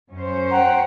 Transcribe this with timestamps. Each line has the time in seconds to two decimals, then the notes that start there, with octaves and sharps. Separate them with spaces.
0.12 F#2 C#4 C5
0.51 F#5 G5 A#5